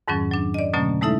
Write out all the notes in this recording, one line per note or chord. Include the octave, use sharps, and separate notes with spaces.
F2 G#2 D#3 F#3 C#4
F#3 D4
D5 D#5
B2 D3 F#3 A3 A#3 C#4
G#3 A3 D#4 E4 A4 E5